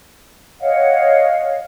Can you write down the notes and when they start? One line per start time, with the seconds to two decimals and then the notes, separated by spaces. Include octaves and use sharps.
0.60 C#5 D#5 F5 F#5